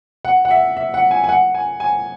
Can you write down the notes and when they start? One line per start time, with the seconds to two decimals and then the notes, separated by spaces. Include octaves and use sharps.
0.25 F#5
0.45 F#5
0.51 E5
0.77 E5
0.94 F#5
1.11 G#5
1.24 G#5
1.29 F#5
1.54 G#5
1.80 G#5